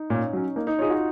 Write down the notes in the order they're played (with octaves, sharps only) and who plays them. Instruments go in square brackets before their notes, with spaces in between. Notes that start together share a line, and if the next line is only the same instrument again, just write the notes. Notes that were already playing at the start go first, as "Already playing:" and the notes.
Already playing: [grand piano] D#4
[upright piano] A#2 [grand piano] C#4
[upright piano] F#3 C#4
[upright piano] A#3 [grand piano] D#4
[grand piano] D#4
[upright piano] D#4 G#4 C#5 [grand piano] F4
[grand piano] F#4